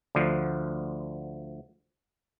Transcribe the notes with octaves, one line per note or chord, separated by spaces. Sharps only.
D2 D3 F3